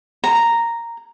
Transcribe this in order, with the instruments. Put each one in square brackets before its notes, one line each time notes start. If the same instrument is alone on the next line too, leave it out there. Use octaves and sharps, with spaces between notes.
[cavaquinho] A#5